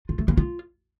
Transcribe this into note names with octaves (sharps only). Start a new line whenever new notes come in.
F4
A3
A#3
F4